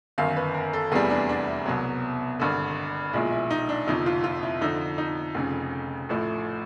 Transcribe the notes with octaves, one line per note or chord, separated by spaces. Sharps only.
G1 F#2 D#3 F5
B4
A#4
A4
F1 E2 C3 E3 G3 G#4
D4
D4
E4
C2 B2 F#3
G#1 G2 D3
B1 A#2 F3 G#3 E4
E4
D#4
D4
G1 F2 C3 F3 D#4
F4
F4
E4
F2 D3 F3 D#4
D#4
F1 F2 C#3
A1 A2 F3 A3